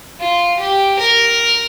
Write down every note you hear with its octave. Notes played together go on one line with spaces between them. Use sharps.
F4
G4
A#4